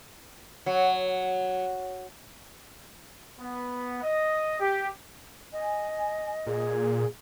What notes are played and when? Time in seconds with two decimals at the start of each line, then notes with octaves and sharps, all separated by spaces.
0.66 F#3
3.39 B3
4.03 D#5
4.60 G4
5.53 D#5 G#5
6.47 A#2 G#4